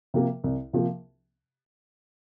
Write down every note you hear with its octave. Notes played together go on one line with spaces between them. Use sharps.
C3 F3 A#3
C2
C3 F3 A#3